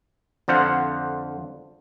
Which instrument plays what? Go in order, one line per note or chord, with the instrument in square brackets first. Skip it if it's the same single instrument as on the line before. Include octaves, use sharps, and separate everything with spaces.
[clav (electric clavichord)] F2 D3 C5 F5 F#5